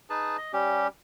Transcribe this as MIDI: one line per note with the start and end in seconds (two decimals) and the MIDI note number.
0.10 0.37 63
0.10 0.37 68
0.10 0.37 71
0.10 0.37 81
0.38 0.52 75
0.53 0.88 55
0.53 0.88 61
0.53 0.88 67